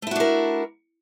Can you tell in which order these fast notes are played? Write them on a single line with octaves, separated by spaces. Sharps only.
A3 E4 F#4 D4 A#4